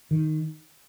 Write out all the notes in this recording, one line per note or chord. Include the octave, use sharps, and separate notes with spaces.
D#3